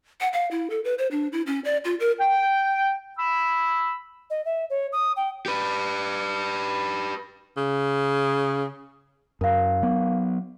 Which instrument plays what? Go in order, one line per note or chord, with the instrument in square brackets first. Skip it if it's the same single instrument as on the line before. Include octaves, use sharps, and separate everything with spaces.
[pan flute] F#5
F5
E4
A4
B4
C5
D4
E4
C#4
D5
F4
A#4
[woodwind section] G5
B5 E6
[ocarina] D#5
E5
C#5
D#6
G5
[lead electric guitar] G4 B4
[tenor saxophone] C#3
[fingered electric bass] F#2 [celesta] A#4 F5
[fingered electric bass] F#3 B3